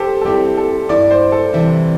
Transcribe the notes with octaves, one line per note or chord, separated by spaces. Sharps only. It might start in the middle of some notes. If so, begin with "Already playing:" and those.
Already playing: G4 A4 C5
A4
G3 C4 E4 G4
A4
G2 G3 E4 D5
C5
A4
C3 E3 G3 E4